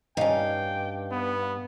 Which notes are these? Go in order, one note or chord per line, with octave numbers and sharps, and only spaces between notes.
G2 C#4 D#4 F5 G5
B3